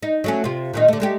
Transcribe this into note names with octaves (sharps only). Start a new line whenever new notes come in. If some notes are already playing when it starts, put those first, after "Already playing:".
D#4
F#3 A3 C#4
C3 F4
A#2 D#3 D#4
D3 A3
G#3 A3 G4